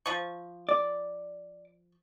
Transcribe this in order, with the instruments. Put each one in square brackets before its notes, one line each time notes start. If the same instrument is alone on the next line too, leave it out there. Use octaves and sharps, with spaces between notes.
[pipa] F3 C#6
[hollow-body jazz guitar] D5